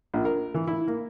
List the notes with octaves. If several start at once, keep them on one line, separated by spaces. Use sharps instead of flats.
A#1
A#4
E3
E4
A#3